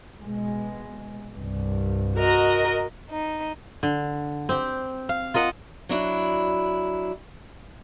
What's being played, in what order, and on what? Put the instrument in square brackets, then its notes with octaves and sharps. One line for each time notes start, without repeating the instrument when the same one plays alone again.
[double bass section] B2 G#3
C2 G2
[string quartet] F#4 A#4 D#5
D#4
[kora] D3
C4 G4
F5
F4 A#4 D#5 F#5
[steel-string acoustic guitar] F#3 D4 E4